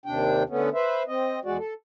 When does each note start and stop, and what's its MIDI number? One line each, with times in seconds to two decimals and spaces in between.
0.06 0.43 39
0.06 0.43 48
0.06 0.43 62
0.06 0.43 79
0.49 0.69 50
0.49 0.69 57
0.49 0.69 59
0.49 0.69 61
0.74 1.03 71
0.74 1.03 72
0.74 1.03 76
1.08 1.39 60
1.08 1.39 75
1.45 1.57 40
1.45 1.57 56
1.45 1.57 66
1.45 1.57 74
1.58 1.73 69